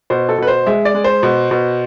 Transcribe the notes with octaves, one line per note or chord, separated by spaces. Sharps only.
B2 C5
A4
B2 B4
C5
G#3 E5
D5
G#3
C5
B2
B2